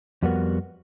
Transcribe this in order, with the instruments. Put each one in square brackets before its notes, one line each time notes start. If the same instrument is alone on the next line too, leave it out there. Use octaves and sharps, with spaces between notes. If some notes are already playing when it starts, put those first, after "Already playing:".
[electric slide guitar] F2 G3 B3 F#4 A#4